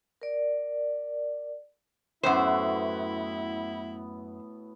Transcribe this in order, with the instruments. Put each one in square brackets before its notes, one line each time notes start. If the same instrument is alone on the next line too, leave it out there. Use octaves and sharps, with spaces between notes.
[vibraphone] A#4 D5
[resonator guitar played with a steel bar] F#2 C5 [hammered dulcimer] A2 B3 F#4 [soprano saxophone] E4